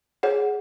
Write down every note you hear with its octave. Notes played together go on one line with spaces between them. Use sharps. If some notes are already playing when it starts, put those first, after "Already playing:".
G#4 C#5 F#5